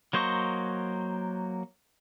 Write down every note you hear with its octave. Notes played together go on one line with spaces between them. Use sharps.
F#3 A#3 C5 D#5 C#6